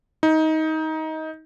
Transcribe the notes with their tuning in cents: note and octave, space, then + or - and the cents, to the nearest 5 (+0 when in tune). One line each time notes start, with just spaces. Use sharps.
D#4 +20